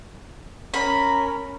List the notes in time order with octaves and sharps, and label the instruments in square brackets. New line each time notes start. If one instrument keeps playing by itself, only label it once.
[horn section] C#4 A#4 [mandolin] B5